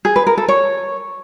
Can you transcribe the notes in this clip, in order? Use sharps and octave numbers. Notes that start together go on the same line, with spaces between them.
G#4
B4
A#4
A4
C#5